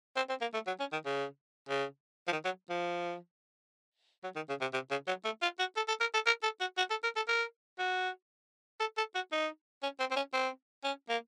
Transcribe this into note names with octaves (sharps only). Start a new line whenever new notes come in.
C4
C4
A#3
A3
F#3
C#4
D#3
C#3
C#3
F3
D#3
F#3
F3
F#3
D#3
C#3
C3
C3
C#3
F#3
A3
F4
F#4
A4
A4
A#4
A4
A#4
A4
F#4
F#4
A4
A#4
A4
A#4
F#4
A4
A4
F#4
D#4
C#4
C4
C4
C#4
C4
C#4
A#3